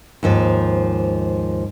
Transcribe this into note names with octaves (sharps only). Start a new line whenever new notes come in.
D#2 G#2 F3